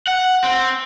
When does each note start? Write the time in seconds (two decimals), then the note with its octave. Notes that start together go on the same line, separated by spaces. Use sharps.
0.07 F#5
0.44 C4